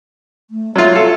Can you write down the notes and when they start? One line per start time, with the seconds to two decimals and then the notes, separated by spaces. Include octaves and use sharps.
0.50 A3
0.76 F#3 F4 E5
0.95 A4